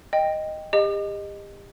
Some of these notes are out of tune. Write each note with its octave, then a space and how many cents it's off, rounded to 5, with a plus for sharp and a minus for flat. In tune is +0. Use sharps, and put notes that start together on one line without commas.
D#5 +0 G5 +10
G4 +35 D#5 -10